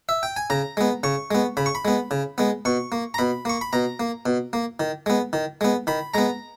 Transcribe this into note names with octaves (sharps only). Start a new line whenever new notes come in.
E5
G5
G#5
C#3 A#5
G#3 B3
C#3 C#6
G#3 B3
C#3 B5
C#6
B5
G#3 B3
C#3
G#3 B3
B2 C#6
A#3
A#5
B2 B5
A#3 C#6
B5
B2 A#5
A#3
B2
A#3
D#3
G#3 B3
D#3
G#3 B3
D#3 B5
G#3 B3 A#5